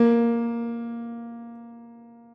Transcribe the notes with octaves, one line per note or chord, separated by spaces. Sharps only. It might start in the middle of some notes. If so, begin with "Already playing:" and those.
Already playing: A#3